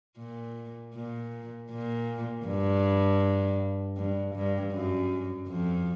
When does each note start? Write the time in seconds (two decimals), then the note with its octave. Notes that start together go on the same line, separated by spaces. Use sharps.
0.18 A#2
0.94 A#2
1.70 A#2
2.46 G2
3.97 G2
4.34 G2
4.73 F#2
5.48 F2